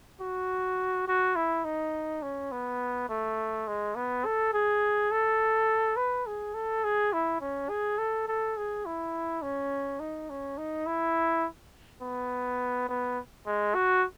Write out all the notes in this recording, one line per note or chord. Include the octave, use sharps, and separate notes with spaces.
F#4
F#4
E4
D#4
C#4
B3
A3
G#3
B3
A4
G#4
A4
B4
G#4
A4
G#4
E4
C#4
G#4
A4
A4
G#4
E4
C#4
D#4
C#4
D#4
E4
B3
B3
G#3
F#4